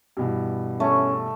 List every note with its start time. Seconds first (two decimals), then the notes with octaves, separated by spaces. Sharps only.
0.17 G2 B2 E3
0.80 A3 C#4